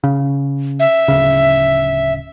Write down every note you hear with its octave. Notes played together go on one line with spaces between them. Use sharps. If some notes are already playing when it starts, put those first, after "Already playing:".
C#3
E5
D1 C#3